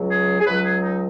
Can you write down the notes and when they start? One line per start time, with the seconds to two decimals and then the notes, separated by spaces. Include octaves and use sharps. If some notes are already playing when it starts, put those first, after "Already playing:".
Already playing: C#2 C#3 F#3
0.10 G#4
0.40 G#4
0.46 C#2 C#3 F#3 B4
0.65 G#4
0.83 D#4